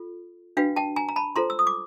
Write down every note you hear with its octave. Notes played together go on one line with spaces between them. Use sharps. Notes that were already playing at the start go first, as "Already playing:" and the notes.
Already playing: F4 A4
D4 F#4 B4 F5 G5
G5 A5
G#5 A#5
A#5
A5 B5
F4 A4 C5 A#5 C6
E6
D#6
D6